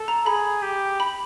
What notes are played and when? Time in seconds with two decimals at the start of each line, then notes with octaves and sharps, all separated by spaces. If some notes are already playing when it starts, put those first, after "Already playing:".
Already playing: A4
0.08 A#5
0.26 G#4 B5
0.62 G4
1.00 B5